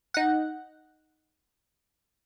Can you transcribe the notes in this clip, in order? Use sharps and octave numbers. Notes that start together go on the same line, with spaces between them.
D#4 F#5